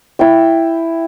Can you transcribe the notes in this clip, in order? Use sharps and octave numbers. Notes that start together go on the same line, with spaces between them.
E4 G5